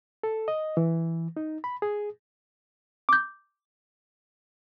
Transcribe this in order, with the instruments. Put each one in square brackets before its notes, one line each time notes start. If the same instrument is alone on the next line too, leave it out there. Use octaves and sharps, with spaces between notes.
[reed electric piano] A4
D#5
E3
D#4
B5
G#4
[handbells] D6 G6